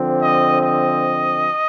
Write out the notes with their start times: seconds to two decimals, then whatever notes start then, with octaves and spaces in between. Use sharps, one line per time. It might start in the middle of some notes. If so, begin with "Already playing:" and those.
Already playing: D3 F3 C4
0.20 D#5
0.62 D#5